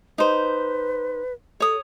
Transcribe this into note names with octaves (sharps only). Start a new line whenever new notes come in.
D#4 B4 C5
A4 C#5 D#6